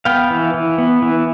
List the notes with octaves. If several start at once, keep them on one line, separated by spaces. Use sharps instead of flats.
B3 F5 G5
E3
E3
B3
E3